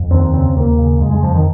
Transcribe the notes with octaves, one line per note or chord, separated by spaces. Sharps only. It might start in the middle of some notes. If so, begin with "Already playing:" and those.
Already playing: F2
D#2 C4
C#3 C4
D#2 A#3
C#3
F2 G#3
G#3
F2 F3
D#3